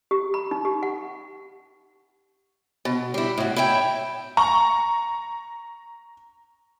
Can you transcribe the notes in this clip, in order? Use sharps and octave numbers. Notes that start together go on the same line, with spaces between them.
G4
B5
D#4
G4
F#5
B2
G3 E4
A2 F#4
E4 C#5 E5 G5
A#5 C#6